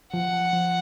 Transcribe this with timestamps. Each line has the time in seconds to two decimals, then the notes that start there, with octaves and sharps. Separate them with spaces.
0.14 F3 F#5
0.33 F3
0.53 F3